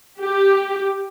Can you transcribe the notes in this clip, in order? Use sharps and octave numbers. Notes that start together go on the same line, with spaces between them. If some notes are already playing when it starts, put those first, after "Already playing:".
G4